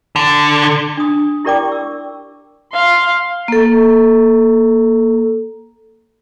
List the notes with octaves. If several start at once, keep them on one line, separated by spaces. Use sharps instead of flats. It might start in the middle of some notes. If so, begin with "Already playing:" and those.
D3
D4 D#6
E4 G4 A#4 D5 G5 D6
C#6 E6
F5 C6
A#3 A4